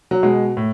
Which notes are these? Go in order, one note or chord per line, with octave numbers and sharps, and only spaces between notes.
F#3
B2 G#3
A2